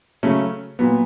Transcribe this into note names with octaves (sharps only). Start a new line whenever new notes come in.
C#3 F#3 A3 C#4
A#2 F#3 B3